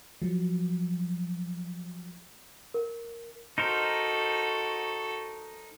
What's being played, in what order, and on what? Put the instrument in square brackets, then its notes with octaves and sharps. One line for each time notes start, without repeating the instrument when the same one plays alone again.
[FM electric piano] F3 F#3
[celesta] A#4
[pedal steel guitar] D#4 A#4 C5 [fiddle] F#4 A4